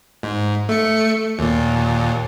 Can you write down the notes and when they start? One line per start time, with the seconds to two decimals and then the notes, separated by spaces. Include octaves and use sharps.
0.23 G#2
0.69 A3 C#7
1.39 D#2 A#2